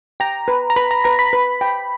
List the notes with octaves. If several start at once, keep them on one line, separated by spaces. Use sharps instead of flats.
G5 A#5
B4
A#5
B4 B5
A#5
B4 A#5
B5
B4
G5